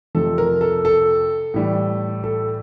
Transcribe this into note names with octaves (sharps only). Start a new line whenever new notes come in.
F2 C3 F3 A4
A#4
A4
A4
A2 E3 G3
A4